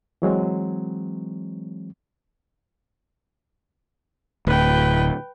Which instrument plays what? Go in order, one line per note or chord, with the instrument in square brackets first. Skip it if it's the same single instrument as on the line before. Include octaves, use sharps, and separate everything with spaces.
[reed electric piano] E3 F#3 G#3 C4
[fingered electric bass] D1 [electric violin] B4 G5